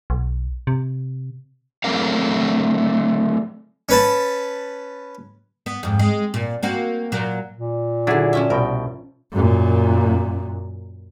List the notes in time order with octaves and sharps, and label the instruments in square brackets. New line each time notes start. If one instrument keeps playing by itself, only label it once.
[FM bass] B1
C3
[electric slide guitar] F#3 A3 C4 A#4 F5
[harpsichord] C#4 B4 A5
[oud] B3
F2 G#2
G#3
A#2
A#3 C4 F#4
A#2 F#3 A#4
[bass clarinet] A#2
[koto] D3 F#3 [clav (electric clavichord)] D4 E4 G#4
[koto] F3 C#4 E5
[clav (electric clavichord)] C2 B2 G5 [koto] A#4
[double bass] F#2 A#2